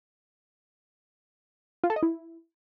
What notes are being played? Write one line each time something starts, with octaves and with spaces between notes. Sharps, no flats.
F4
A4
D#5
E4